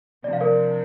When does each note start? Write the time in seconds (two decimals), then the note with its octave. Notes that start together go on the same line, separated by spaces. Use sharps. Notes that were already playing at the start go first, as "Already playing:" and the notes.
0.24 C3 F3 D4 D5
0.33 F5
0.41 A#4 D5